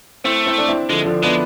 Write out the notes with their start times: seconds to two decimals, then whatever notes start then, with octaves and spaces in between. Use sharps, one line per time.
0.24 A3 C4 E4
0.46 C4 E4
0.58 D4
0.68 C4 E4
0.89 D3 F3 G#3
1.06 D3 F3
1.22 G#3 B3 D4